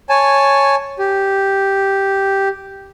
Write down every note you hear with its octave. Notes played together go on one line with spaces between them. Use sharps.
C#5 G#5 A5
G4